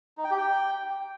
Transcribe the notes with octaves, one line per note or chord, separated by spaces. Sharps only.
D#4
G5
G4
G5